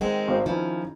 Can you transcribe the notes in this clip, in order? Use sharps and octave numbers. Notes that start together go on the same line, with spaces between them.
D#3 G#3 C4 F#5
G#1 C5
D#3 F3 C#4 E4